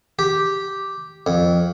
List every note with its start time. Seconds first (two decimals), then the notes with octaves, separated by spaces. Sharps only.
0.19 G4
1.27 F2